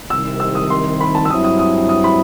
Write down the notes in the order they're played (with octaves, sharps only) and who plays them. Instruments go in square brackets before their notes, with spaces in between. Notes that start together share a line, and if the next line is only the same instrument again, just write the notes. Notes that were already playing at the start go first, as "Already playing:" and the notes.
[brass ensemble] C2 C3 D#3 [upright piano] E6
[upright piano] E6
D#6
C6
B5
A5
E6
[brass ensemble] G2 F#3 C4 E4 [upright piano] D#6
[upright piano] D#6
D#6
D#6
B5